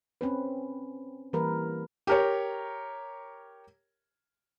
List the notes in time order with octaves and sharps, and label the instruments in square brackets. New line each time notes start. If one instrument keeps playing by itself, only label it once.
[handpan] C4 C#4 B4
E3 G3 A#3 A#4 B4
[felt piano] G4 A#4 C#5